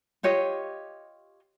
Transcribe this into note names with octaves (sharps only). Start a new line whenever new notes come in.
F4 G4 C#5 D#5